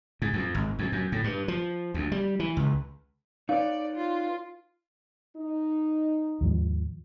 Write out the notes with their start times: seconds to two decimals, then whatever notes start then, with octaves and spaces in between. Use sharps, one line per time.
0.22 G#2
0.34 F2
0.55 G#1
0.79 F2
0.92 F#2
1.12 A2
1.24 G2
1.48 F3
1.94 D2
2.12 G3
2.40 E3
2.57 C#2
3.49 D#4 B4 C#5 D5 F5
3.96 F4
5.37 D#4
6.41 D#2 G#2 F3